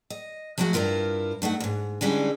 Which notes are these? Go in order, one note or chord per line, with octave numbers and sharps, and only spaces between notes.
D#5
F3 F#3 G#3 A3 F#4
G2 E4 F4 A#4 B4
G2 A3 D#4 F#5
D#2 G#2
D3 E3 G3 G#3 C#4